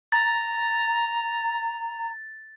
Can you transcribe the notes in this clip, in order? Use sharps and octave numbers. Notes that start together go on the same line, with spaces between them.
A#5 A6